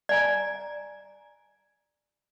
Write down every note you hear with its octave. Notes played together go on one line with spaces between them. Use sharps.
D5 G#5 A#5